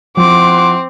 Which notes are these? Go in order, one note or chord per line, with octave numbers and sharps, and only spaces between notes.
F3 C4 E4 F#5 C6 D6